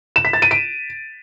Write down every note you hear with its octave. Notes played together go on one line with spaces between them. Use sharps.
E7
B6
A6
D#7
D7